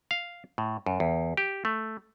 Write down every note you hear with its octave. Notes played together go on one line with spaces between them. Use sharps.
F5
A2
F#2
E2
G4
A3